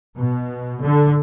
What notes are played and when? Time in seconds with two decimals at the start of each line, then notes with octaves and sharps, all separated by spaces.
0.17 B2
0.82 D3